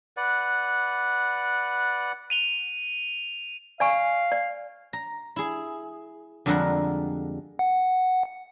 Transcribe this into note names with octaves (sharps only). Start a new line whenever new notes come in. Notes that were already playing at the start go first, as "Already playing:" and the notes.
B4 D5 F#5
D#7 F7 G7
D5 F5 G#5 C#6
D5
A#5
E4 G#4
F2 D3 G3 G#3 A#4 F#5
F#5